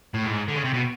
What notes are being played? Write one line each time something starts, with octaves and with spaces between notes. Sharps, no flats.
A2
G#2
D3
C#3
C3
B2